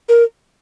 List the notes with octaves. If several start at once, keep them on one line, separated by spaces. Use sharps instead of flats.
A#4